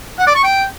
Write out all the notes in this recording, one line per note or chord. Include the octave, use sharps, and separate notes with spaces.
F#5
D5
C#6
G5